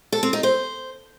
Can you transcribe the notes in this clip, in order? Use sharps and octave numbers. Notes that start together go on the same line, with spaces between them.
A4
C4
D#4
C5